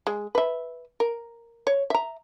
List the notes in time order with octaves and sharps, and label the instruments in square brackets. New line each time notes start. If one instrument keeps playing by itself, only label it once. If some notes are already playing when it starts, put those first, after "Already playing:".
[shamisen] G#3
B4 E5
A#4
C#5
E5 A#5